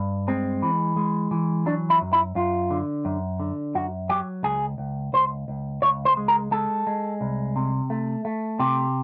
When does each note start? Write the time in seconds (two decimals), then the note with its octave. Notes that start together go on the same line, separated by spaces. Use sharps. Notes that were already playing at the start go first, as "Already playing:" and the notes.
Already playing: G2
0.28 G#3 C4
0.62 E3
0.96 G#3
1.31 E3
1.66 F#3 D4
1.90 E4
2.01 F#2
2.13 E4
2.35 F#2 F4
2.71 D3
3.05 F#2
3.40 D3
3.75 F#2 F#4
4.09 F#3 G4
4.43 C#2 G#4
4.78 C#2
5.13 C#2 C5
5.48 C#2
5.82 C#2 C#5
6.05 C5
6.17 G#3
6.28 A#4
6.51 G#3 A4
6.87 G#3
7.21 C2
7.56 C3
7.90 A3
8.25 A3
8.59 C3 G4